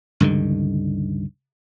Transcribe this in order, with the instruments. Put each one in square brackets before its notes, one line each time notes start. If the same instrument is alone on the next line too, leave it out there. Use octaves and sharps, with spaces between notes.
[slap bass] C#2 G2 D3 D#3